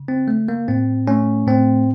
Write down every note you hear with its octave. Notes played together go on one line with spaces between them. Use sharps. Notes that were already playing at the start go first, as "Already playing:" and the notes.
Already playing: C#3
C4
A3
A#3
A2 C4
A3 C#4
A2 C4